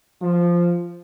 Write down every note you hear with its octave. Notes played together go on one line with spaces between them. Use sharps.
F3